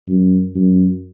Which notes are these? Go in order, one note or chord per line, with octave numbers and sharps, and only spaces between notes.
F#2
F#2